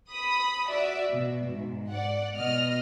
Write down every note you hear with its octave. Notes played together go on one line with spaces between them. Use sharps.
B5 D#6
F#4 D5 E5
B2
G#2
D5 F#5
B2 D#5 F6